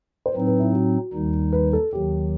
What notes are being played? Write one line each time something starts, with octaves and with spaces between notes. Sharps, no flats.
C5
A2 F#3 C4 D#4 B4
B4
E4
F#4
D#2 D#3 G3 D#4
B4
A4
D#2 D#3 F#3 G4